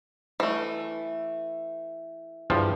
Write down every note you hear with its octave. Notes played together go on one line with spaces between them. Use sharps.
E3 A3
E2 G2 F3